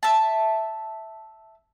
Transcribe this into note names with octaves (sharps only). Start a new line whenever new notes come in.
E5 A5